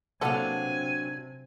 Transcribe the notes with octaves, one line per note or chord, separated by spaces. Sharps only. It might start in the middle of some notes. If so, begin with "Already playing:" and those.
C3 F#3 A#3 B3 D4 A4 F5 G#5